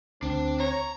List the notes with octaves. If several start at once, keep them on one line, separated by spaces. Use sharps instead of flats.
D2 C4 D4
C#5 A#5